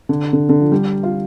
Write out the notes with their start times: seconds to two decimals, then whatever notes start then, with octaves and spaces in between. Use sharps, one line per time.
0.09 D3
0.33 D3
0.49 D3
0.61 F3
0.72 G3
1.03 F4